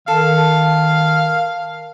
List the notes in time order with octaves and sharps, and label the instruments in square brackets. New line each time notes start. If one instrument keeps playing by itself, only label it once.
[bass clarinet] D#3 [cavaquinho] A4 [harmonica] F5